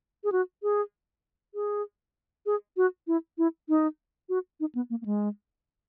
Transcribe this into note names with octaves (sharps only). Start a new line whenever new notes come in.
G#4
F#4
G#4
G#4
G#4
F#4
E4
E4
D#4
F#4
D#4
B3
A#3
A#3
G#3